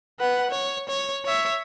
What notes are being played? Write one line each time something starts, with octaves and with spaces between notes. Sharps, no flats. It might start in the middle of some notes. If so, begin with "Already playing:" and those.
B4 F#5
C#5
C#5
C#5 E5